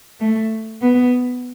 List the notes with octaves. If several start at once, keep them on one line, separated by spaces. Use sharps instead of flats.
A3
B3